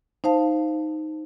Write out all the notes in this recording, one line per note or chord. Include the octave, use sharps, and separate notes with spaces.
D#4 C5 F5 A5